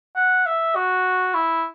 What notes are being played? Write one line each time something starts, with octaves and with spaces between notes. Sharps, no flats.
F#5
E5
F#4
E4